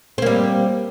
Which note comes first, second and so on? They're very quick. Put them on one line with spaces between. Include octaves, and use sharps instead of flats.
C4 A#3 G3